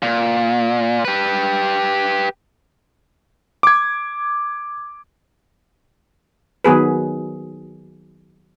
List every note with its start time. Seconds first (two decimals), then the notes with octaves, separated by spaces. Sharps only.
0.03 A#2
1.05 G4 B4
3.63 D6 G#6
6.64 D#3 F#3 B3 G#4 B4